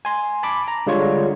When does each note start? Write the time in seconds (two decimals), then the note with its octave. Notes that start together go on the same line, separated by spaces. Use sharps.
0.05 G#5 C6
0.43 A5 B5 D6
0.68 A#5
0.87 D3 G3 G#3 F4 C#5 C#6